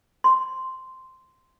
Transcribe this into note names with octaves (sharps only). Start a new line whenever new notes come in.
C6